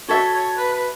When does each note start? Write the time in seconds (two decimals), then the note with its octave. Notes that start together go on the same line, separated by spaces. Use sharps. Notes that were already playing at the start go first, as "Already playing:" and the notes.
0.08 F#4 A4 C#5 E5
0.33 C#5
0.57 B4
0.73 B4